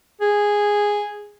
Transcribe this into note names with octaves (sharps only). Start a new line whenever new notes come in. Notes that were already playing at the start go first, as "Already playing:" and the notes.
G#4